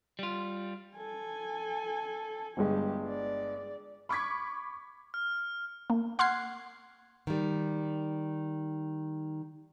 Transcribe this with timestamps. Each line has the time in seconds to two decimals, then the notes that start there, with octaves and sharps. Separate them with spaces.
0.19 G3 F4
0.97 A4 G#5
2.57 G1 G2 G#3 G4
3.08 D5
4.09 B5 C#6 D6 G#6 B6
5.14 F6
5.90 A#3
6.19 F#5 C6 F6 F#6 G#6 C7
7.27 D#3 G3